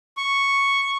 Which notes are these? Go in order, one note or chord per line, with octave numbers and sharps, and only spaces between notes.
C#6